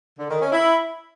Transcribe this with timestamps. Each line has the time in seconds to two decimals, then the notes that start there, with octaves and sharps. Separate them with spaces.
0.19 D3
0.30 D#3
0.41 C#4
0.53 E4